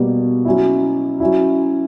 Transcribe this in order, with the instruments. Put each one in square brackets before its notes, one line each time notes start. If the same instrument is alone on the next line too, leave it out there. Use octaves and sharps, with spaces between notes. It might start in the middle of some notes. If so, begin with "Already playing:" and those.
Already playing: [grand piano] B2 G3 A#3
F#3 C#4 E4
F#3 C#4 E4